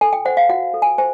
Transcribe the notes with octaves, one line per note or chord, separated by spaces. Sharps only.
A4 G#5
G5
C5 F#5
F5
F#4 F#5
A4
G#5
C5 G#5